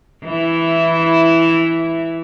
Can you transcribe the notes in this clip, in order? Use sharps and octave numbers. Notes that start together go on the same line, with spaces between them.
E3 E4